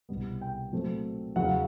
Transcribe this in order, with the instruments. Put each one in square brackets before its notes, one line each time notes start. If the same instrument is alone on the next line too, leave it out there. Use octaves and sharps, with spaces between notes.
[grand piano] C2 B2 G3 B3
G5
A#2 F#3 A3 C4
E2 C#3 F#3 F#5
F5